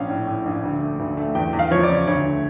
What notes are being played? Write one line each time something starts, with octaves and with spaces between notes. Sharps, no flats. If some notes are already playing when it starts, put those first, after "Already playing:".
Already playing: A#1 C#4 F5
A2
A2
A#1
D2
A3
D2
A3
E2 G5
E2
F5
F3 C#5
D5
C#3
D2 C#5
A3